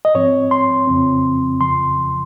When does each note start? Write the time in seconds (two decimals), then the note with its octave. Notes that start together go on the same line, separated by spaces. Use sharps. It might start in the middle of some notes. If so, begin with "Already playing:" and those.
0.05 D#5
0.15 G#2 F3 C4 C#5
0.51 C6
0.87 F2 C#3 F3 C4
1.61 F2 C#3 F3 C6